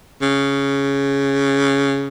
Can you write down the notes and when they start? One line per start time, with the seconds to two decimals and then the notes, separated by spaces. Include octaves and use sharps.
0.22 C#3